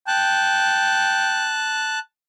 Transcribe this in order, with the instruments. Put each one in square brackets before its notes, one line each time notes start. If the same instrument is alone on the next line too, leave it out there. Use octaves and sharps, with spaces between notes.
[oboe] G5 [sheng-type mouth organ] A5 F#6